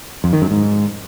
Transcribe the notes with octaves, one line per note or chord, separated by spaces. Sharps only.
F2
D#3
F#2
G#2